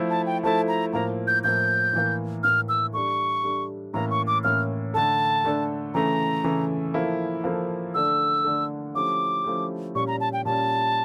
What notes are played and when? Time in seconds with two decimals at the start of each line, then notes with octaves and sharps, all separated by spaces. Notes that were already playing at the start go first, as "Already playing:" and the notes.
Already playing: F3 A3 E4 A4
0.10 A5
0.26 G5
0.43 F3 A3 E4 A4 A5
0.68 A#5
0.93 A2 F3 A#3 A#5
1.27 G6
1.44 A2 F3 A#3 G6
1.93 A2 E3 A#3
2.43 A2 E3 A#3 F6
2.69 E6
2.93 G3 D4 A4 C#6
3.43 G3 D4 A4
3.94 A2 E3 A#3 C#4 A#5
4.10 C#6
4.27 D6
4.44 A2 E3 A#3 C#4 F6
4.94 D3 A3 D4 A4 A5
5.44 D3 A3 D4 A4
5.94 C#3 E3 A3 A#5
6.44 C#3 E3 A3
6.94 F3 A#3 E4 A4
7.44 F3 A#3 E4 A4
7.94 D3 A3 D4 A4 E6
8.44 D3 A3 D4 A4
8.94 F3 A3 C#4 E4 G4 D6
9.44 F3 A3 C#4 E4 G4
9.95 A#2 G3 C#4 C#6
10.07 A#5
10.20 A5
10.33 G5
10.45 A#2 G3 C#4 A5